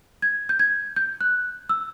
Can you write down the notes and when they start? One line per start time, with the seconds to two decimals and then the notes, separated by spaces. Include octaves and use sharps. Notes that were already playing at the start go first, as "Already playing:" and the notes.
0.22 G#6
0.49 G6
0.59 G#6
0.96 G6
1.21 F#6
1.69 E6